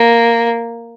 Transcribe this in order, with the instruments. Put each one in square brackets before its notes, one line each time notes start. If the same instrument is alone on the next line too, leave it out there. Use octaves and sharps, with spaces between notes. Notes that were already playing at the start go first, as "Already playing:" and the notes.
Already playing: [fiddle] A#3